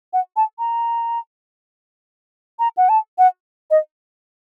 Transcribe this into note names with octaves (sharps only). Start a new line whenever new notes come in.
F#5
A5
A#5
A#5
F#5
A5
F#5
D#5